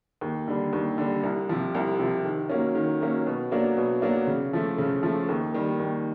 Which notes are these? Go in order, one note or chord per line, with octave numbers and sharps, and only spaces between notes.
D#2
D3 G3
D#2
D3 G3
C2
C3 F3
C2
C3 F3
D#3
F#3 A#3 C#4
D#3
F#3 A#3 C#4
B2
F#3 A#3 D4
B2
F#3 A#3 D4
C#3
F3 A3
C#3
F3 A3
D#2
D#3 G3
D#2